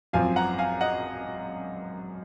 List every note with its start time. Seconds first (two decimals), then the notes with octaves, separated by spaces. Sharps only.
0.13 G#1 F#2 F3 C4 F5 G#5
0.36 F#5 A#5
0.59 F5 G#5
0.81 D#5 F#5